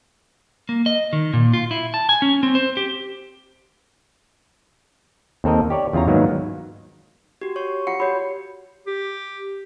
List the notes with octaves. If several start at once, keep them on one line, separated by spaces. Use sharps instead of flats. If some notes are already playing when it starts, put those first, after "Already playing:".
A#3
D#5
D#3
A#2
F4
E4
A5
G#5
C#4
C4
C5
G4
D#2 C4 A4 A#4 D#5
G4 C#5 D5
E2 C#3 F4 C#5 A#5
G#2 D#3 F#3 A#3 B3
F#4 G4
C#5 C#6
F4 F#5 C#7
F#4 G4 C#5 B5
G4